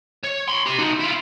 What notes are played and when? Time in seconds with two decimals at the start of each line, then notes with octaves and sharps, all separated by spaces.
0.24 C#5
0.48 B5 C6
0.66 G4 C6
0.79 D#4 F#4
0.99 E4 F4